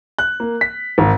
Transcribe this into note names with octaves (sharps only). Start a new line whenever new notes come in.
F#6
A#3
B6
G#1